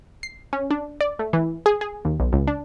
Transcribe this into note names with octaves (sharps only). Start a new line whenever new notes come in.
C7
C#4
D4
D5
A3
E3
G#4
G#4
D#2
B1
C#2
D4